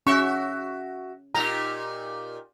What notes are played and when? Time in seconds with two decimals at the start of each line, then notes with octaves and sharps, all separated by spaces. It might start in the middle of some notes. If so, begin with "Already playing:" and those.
0.07 C#4 F#4 E5 C#6
1.35 A#2 D#4 G4 A#5